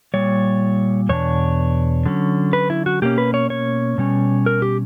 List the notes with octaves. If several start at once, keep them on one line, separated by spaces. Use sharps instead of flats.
A#2 G3 C#5
E2 B2 D4 C#5
D3 F#3 C#4
B4
E4
F#4
B2 A#3 C#4 G4
B4
C#5
C#5
B2 G3 C#4
A#4
G4